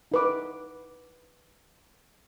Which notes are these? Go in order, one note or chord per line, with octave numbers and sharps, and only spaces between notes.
D#4 B4 D6